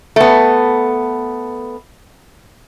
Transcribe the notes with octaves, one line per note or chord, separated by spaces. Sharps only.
A3 B3